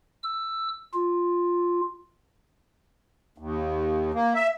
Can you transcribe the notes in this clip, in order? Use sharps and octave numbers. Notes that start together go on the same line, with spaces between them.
E6
F4
D#2
A#3
E5